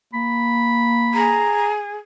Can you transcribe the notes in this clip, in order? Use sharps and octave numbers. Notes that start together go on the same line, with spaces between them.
A#3 B5
G#4 A#5